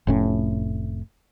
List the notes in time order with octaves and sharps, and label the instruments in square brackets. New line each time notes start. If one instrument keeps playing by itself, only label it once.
[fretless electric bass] F1 A2 C#4